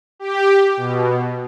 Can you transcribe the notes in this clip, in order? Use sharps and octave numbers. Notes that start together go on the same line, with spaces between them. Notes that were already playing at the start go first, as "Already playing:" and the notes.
G4
B2